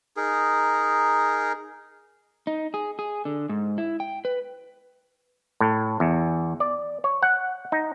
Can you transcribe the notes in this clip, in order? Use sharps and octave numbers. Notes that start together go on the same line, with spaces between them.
D#4 G#4 A#4
D#4
G#4
G#4
D3
G#2
E4
G5
B4
A2
E2
D5
C#5
F#5
D#4